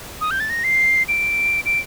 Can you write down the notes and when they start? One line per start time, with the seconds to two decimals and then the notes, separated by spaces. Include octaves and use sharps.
0.21 D#6
0.31 G6
0.40 A6
0.50 A#6
0.64 C7
1.08 D7
1.66 D7